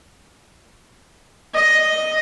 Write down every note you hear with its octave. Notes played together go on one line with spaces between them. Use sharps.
D#5